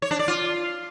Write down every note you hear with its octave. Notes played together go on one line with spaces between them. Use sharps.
C#5
D4
D5
F4